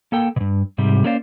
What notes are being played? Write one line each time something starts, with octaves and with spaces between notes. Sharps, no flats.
A#3 A4 G5
G2 B2
G#2 C3 G3
A3 A#3 C#4 C5 D5 F5